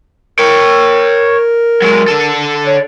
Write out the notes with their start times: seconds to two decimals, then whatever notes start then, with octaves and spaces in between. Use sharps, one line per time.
0.39 A#4 C#5 G5
1.82 F#3 G#3
2.08 D3 A4
2.66 C#5